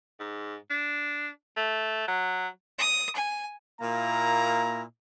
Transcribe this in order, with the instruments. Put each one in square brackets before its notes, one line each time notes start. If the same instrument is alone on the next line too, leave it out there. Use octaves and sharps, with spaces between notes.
[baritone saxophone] G#2
D4
A3
F#3
[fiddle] D#6
G#5
[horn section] A#2 A#3 E4 A#5